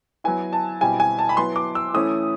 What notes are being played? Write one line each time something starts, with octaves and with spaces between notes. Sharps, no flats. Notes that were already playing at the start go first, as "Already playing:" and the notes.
F#3 B3 E4 G#5
A5
B2 G3 C4 E4 G#5
G#5
A5
B5
F#3 B3 E4 C6
D6
E6
E3 A3 C#4 E4 D#6